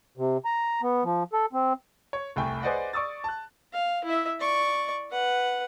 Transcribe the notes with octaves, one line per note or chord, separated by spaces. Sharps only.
C3
A#5
B3
F3
A4
C4
C#5
F1 C2 A3 G5 G#5
G#4 B4 C5 D5 D#5 F#5
D5 C#6 D#6 E6 A6
A5 F#6
F5
E4 E5
D5 C#6
B4 F#5